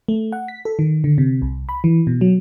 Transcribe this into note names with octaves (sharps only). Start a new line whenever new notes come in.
A3
F#5
B6
A4
D#3
D3
C3
C2
B5
E3
B2
F#3